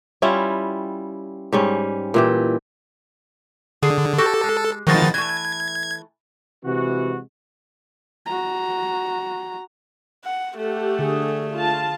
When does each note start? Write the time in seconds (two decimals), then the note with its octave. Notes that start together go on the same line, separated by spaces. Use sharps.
0.22 G3 C#4 E4 F4
1.52 G#2 G3 C#4
2.14 A#2 E3 G4
3.83 D3 G#4
4.18 F#4 G4 A4
4.43 G#3
4.87 D#3 F3 F#3 G#3 B3 A6
5.14 E3 A3 G#6
6.64 C3 E3 G#3 F#4
8.26 F#4 A#5
10.24 F#5
10.57 A3 G4 A4 F#5
10.99 D3 G#4
11.52 F4 A5